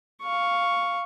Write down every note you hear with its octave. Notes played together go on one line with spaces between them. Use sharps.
F5 C#6